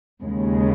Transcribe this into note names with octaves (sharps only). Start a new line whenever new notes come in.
D#2 C#3 G#3